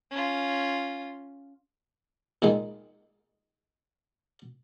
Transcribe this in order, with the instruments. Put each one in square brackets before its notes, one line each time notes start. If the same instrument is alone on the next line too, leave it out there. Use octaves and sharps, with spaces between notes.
[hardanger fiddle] C#4 F4
[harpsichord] A#2 D#3 G#3 D#4